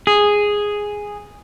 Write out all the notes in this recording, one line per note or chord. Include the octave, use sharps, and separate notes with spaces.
G#4